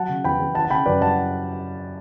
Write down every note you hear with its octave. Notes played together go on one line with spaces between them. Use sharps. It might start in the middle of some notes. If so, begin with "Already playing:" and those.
Already playing: F#3 F#5 A5
C#3
E2 G5 B5
E2
E3 F#5 A5
A5
C#3 G5 B5
F#2 B4 D5
G3 F#5 A5